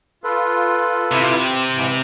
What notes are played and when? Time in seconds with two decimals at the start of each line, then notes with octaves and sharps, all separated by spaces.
0.24 F4 A4 B4
1.11 C3 E4 F4
1.42 C4
1.74 G#2 E3